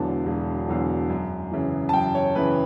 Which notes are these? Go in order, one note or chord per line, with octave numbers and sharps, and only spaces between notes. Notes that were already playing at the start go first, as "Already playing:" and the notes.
Already playing: E1 E2 D3 F#3 A5
E1
E2 D3 F#3
F#2
C#3 E3
A5
F#2 G5
C#5
C#3 E3 B4